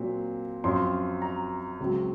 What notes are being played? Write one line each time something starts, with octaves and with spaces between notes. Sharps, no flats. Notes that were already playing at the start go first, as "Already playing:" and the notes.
Already playing: A#2 F#3 C4
F#2 F3 C4 C6
A#5
C#2 C#3 F#3 C4